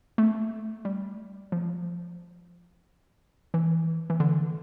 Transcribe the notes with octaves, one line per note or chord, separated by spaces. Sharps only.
A3
G3
F3
E3
E3
D3